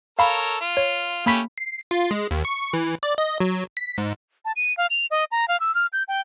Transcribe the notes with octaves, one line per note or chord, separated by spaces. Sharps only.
A4 A#4 C#5 F5 B5
F4
C#5
A3 A#3 C#4 G4 B5 B6
C7
F4
G#3
D#2
C#6
E3
D5
D#5
F#3
B6
G#2
A5
D#7
F5
F7
D#5
A#5
F5
E6
F6
G6
G5